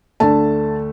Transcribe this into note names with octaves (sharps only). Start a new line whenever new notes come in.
D2 D3 A3 A5